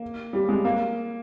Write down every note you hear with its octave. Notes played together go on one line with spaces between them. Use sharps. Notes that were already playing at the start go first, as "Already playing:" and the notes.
Already playing: A#3
G3
G#3
A#3